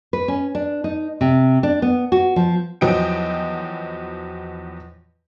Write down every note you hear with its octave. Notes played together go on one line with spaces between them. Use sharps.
B4
C#4
D4
D#4
C3
D4
B3
F#4
F3
E2 F3 F#3 D#5 G5 D7